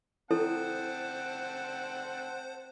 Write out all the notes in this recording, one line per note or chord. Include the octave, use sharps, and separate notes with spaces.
C4 E4 A4 C5 F#5 A5